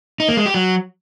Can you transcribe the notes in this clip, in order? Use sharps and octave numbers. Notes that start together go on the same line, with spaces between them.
D#4
A#3
G#3
G4
F#3